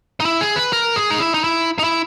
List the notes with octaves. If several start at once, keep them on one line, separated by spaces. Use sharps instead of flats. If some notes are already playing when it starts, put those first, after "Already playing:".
D#4
E4
G#4
B4
A#4
G#4
D#4
E4
D#4
E4
D#4
E4